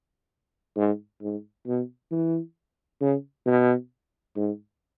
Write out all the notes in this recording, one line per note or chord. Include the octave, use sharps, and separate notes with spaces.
G#2
G#2
B2
E3
C#3
B2
G#2